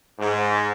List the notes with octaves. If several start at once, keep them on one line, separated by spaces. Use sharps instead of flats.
G#2